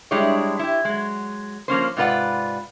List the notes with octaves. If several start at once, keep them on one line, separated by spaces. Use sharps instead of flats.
G3 G#3 D4 E4 C#5
E4 G4
F#3 G#3
F3 A#3 C#4 C5
G#2 C3 F4 B4 D5 F#5